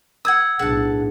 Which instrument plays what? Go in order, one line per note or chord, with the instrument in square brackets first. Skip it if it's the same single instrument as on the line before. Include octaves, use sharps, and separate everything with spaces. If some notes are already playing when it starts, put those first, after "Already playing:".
[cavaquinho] F#5 D#6 [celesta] E6 G#6
[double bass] B1 A2 [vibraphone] D4 G#4 [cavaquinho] F#5 A5